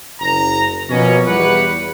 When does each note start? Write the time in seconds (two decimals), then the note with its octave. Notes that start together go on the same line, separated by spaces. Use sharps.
0.20 F#1 A#5
0.89 B2 F3 A#3 C#4
1.27 E2 G3 G4 B4 F#5